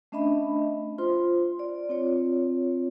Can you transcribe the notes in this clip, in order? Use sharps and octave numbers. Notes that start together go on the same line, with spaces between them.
A3 C#4 D4 D#5 E5 B5
F4 C5 C6
D5
C4 F4 C#5